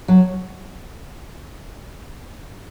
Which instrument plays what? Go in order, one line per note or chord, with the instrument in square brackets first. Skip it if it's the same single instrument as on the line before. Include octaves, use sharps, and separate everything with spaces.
[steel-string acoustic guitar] F#3